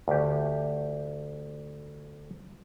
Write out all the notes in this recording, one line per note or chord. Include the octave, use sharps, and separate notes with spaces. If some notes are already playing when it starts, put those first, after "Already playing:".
D2 G4